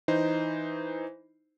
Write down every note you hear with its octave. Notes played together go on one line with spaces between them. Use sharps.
E3 D#4 C5